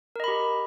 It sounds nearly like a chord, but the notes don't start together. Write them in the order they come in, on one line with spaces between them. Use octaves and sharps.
A#4 D#5 B5 G4